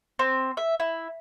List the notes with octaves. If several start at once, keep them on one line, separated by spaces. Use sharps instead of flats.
C4
E5
E4